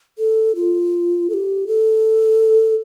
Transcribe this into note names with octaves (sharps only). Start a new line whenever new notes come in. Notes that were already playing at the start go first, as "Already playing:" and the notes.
A4
F4
A4
G4
A4